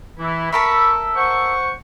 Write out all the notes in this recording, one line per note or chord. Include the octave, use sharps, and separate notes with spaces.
E3 E4
A4 A#4 E5 B5 C#6
C5 F#5 C#6